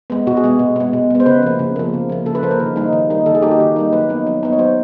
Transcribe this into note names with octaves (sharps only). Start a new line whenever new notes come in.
G#3 B3
B2 F#4
G#4
G#3 B3
B2
G#3 B3
B2
G#3 B3
C5
C#3 B4
F3 A#3
C#3
F3 A#3
C#3
F3 A#3
C#3 A4
B4
F3 A#3 C5
A#4
D#3
G3 A#3 D#4
D#3
G3 A#3 D#4
D#3 A4
G#4
G3 A#3 D#4 G4
F#4
D#3
G3 A#3 D#4
F#3 B4
B3 D#4
F#3
B3 D#4
C#5
F#3 C5